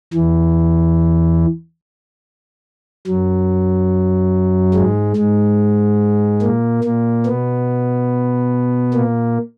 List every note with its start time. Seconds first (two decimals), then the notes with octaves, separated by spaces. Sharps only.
0.13 E2 E3
3.07 F#2 F#3
4.74 G#2 G#3
5.17 G#2 G#3
6.42 A#2 A#3
6.84 A#2 A#3
7.26 B2 B3
8.94 A#2 A#3